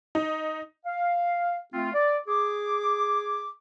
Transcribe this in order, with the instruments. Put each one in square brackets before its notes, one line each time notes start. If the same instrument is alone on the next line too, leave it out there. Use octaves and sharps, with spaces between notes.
[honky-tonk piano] D#4
[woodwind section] F5
A3 C4 F4
D5
G#4 D6